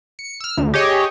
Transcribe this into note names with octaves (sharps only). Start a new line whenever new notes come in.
C#7
E6 F6
D2
G4 G#4 C#5 D#5